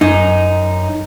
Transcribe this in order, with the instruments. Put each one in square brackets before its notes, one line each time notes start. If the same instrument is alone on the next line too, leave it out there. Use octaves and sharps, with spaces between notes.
[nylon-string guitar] F#2 [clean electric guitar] D#4